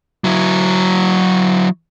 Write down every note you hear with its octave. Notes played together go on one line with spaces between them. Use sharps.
F#3 E4